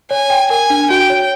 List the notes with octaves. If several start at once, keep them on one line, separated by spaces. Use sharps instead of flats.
C#5 G#5
G5
A#4 G#5
D4
F#4 G5
C#5